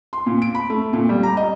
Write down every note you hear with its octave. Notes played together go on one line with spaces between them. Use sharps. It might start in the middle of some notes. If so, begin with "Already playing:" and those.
C6
A#2
D7
B5
A3
A#2
G3
A#5
D#5